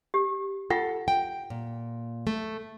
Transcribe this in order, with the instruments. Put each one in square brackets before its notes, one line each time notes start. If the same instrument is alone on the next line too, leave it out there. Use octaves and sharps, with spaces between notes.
[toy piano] G4
[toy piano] F4 F#5 [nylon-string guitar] A4
[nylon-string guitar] G5
A#2
A3